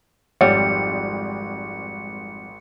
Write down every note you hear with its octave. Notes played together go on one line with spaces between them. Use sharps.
G#1 F2 G3 C#5 E5 F#5 C#7